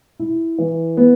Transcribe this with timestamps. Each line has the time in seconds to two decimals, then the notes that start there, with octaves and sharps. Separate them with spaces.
0.20 E4
0.58 E3
0.97 B3